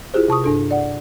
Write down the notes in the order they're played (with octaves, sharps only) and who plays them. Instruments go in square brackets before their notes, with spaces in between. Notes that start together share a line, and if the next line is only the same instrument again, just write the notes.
[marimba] E4 F4 G4 G#4 C5
C3 A5 C#6 D#6
G2 D4 A4
D5 F#5